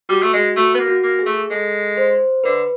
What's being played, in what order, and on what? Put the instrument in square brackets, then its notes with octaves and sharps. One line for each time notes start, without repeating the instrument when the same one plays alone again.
[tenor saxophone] G3 [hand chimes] F#4
[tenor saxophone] A3
G#3
[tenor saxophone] A3 [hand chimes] F#4
[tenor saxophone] B3
A#3
[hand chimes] F#4
[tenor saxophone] A#3
[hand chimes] G#4
[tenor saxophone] A3
[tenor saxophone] G#3 [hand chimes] A4
[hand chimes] C5
[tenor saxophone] D3 [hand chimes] B4